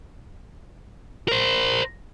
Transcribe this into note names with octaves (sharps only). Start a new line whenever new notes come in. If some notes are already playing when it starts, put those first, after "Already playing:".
A#4 C5